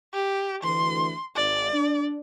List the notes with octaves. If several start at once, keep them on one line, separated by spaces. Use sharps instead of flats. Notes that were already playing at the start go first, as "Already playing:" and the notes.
G4
D2 E3 C6
G#1 D5
D4